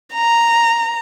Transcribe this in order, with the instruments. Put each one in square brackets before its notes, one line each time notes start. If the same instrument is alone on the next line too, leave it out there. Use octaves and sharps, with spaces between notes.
[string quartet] A#5